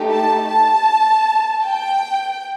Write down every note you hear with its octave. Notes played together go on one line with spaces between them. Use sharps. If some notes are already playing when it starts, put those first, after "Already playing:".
Already playing: A3 D#4 G4
A5
A5
G5